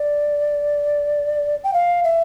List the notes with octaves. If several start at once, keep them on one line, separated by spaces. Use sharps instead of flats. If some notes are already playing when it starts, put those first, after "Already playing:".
Already playing: D5
G5
F5
E5